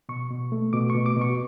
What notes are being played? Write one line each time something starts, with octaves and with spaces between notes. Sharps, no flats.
B2 C#6
B2
A3
B2 D6
C#6
B2
D6
B2
C#6